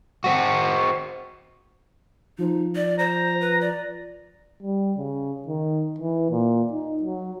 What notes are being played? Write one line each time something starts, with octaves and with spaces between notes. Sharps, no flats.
C4 F#4
F3 D#4
D5
C5 A#5
B4
D5
G3
C#3
D#3
E3
A#2
D#4
F#3